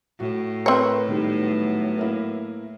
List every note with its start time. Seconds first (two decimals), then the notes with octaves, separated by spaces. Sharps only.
0.20 A2 F#4
0.66 C4 A#4 B4 C#5
1.08 D#3 F#3 G3 B3
1.99 A#3 E4 A#4